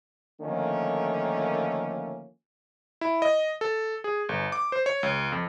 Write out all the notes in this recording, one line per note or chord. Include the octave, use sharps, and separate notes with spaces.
D3 D#3 F3 A3 A#3 C#4
E4
D#5
A4
G#4
G1
D6
C5
C#5
C#2
F2